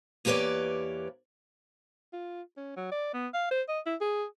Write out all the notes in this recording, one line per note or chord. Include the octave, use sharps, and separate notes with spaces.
E2 A#3 G4 B4 C#5 D5
F4
C#4
F#3
D5
B3
F5
C5
D#5
E4
G#4